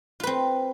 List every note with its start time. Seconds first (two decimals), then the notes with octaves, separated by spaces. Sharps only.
0.20 F4
0.23 B4
0.27 C4